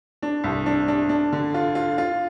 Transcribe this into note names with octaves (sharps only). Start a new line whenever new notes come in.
D4
C2
D4
D4
D4
D3
F4
F4
F4